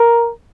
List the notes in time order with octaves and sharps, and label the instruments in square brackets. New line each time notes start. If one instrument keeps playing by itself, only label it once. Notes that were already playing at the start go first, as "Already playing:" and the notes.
Already playing: [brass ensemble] A#4